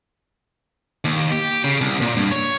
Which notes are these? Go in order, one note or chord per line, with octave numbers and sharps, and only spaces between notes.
D#2
G4
C#3
C2
A#2
G2
C#5